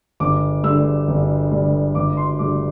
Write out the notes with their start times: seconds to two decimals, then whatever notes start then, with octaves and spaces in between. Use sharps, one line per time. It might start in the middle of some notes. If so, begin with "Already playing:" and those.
0.20 G1 D6
0.63 G2 D3 E6
1.08 G1
1.51 G2 D3
1.95 G1 D6
2.17 C6
2.39 G2 D3 D6